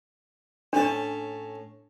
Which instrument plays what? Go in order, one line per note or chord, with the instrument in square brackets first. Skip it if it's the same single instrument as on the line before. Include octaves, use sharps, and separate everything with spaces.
[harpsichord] A2 C#4 A5 [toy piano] D4